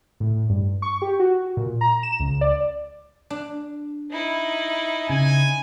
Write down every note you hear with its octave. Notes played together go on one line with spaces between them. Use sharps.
A2
G2
C#6
G4
F#4
A#2
A#5
E7
C#2
D5
D4
D#4 E4
C#3 G#5